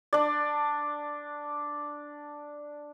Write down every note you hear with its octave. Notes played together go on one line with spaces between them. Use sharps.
D4 D5